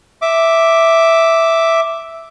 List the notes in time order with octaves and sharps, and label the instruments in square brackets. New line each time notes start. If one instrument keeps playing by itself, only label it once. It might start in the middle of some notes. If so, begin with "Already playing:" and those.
[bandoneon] E5 D6